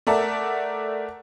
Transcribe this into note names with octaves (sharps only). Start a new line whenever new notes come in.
A3 A#4 D5 E5 F#5 A5